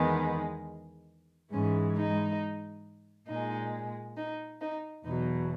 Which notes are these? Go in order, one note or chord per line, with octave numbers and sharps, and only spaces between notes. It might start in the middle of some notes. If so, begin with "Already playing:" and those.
Already playing: E2 D#3 G#3 B3
G#2 E3 G#3 C#4
D#4
A#2 G#3 D#4
D#4
D#4
E2 B2 F#3 D#4